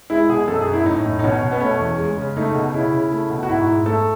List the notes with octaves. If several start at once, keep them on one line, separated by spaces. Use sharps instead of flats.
G#3 E4
B2 G#4
F#2 A4
G#4
F#2
E4
A2 D#4
A2
D#4
B2 C#4
B2
B3
A3 C#4
E2
G#3
C#3
A3 D#4
B2
C#3 E4
C#3
A3
B2
F#4
G#2 E4
G#2
A3 A4